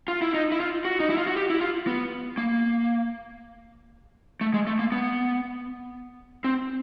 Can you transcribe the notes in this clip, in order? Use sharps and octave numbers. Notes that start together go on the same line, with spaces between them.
F4
E4
D#4
E4
F4
F#4
D#4
E4
F4
F#4
G4
E4
F4
B3
A#3
A3
G#3
A3
A#3
B3
C4